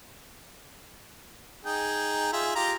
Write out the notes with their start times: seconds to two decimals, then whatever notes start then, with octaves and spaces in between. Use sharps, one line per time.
1.65 D#4 G#4 G5
2.33 F4 G#4 E5
2.55 F4 G4 A#5